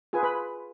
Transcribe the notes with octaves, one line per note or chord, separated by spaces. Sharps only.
F4 G#4 B4 G#5
B4 B5